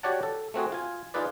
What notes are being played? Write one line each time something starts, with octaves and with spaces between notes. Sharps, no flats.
F#4 G4 C#5 D5 F#5 A5
A4
A3 C4 F#4 G#4
F4 G#5
D#4 F4 G#4 B4 D5